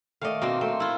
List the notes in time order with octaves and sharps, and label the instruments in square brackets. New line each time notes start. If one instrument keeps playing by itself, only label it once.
[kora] D#3 A3 D5 [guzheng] D#5 F5
[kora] B2 D4 D#4 [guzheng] A#3 C4
[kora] A3 [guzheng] C4
[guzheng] E4 F4